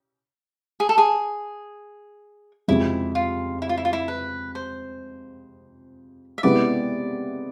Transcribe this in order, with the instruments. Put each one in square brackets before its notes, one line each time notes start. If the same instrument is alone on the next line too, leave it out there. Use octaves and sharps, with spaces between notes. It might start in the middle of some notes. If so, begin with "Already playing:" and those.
[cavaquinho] G#4
A4
G#4
[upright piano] F2 C3 G#3 [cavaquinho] E4
[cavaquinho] F4
E4
F4
E4
F4
E4
B4
C5
E5
[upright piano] C3 G#3 B3 E4 B4 [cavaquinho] D5